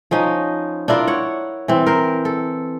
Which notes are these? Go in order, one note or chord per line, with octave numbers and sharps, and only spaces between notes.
F3 C#4 D#4
D4 E4 F4 A#4
C#5 F#5
E3 C4
A#4 C5
A4